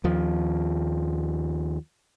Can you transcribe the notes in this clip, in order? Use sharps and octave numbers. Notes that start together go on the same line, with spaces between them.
D#2 F3